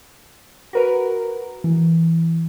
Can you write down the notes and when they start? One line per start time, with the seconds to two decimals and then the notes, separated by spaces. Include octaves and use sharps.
0.73 F#4 A#4 B4
1.64 E3